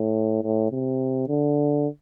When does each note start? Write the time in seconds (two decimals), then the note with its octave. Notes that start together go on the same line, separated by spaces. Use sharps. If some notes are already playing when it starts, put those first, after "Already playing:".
Already playing: A2
0.43 A2
0.71 C3
1.28 D3